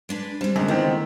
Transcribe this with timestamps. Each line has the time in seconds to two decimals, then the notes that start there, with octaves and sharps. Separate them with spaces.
0.09 G#3 D4 B4
0.41 G3 G#3 C4 D4 E7
0.56 G#1 D3 G#3 A3 C5
0.68 D#3 E3 B3 C4